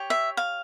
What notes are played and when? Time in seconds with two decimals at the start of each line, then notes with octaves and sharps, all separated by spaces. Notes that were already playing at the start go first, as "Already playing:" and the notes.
Already playing: G4 C#5
0.10 E5
0.37 F5